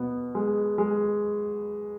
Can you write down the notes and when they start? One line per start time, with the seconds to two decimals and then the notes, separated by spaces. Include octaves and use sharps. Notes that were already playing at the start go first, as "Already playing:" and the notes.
Already playing: B2 B3
0.35 G#3
0.78 G#3